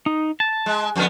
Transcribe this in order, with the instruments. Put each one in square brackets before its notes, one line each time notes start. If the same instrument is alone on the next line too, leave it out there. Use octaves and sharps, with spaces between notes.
[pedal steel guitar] D#4
A5
[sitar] G#3
F2 D3 B3